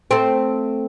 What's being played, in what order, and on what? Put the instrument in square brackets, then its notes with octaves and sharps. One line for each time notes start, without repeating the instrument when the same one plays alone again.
[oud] A3 C4